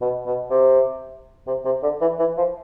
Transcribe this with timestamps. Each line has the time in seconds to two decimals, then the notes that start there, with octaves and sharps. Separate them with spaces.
0.01 B2
0.26 B2
0.50 C3
1.47 C3
1.65 C3
1.83 D3
2.01 E3
2.19 E3
2.38 F3